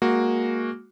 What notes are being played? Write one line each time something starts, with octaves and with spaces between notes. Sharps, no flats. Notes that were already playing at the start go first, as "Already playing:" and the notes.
G#3 A#3 F#4